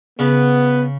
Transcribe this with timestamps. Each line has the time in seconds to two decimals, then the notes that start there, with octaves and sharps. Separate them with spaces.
0.19 C#3 B3